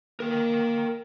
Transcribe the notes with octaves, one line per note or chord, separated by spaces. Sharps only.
A#3 A#4 G5